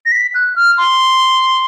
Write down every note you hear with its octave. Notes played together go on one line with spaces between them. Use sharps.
A#6
B6
F#6
F6
C6